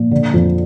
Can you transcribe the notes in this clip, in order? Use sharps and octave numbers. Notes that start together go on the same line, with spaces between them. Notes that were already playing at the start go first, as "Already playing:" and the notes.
Already playing: A#2 F3
D3
F2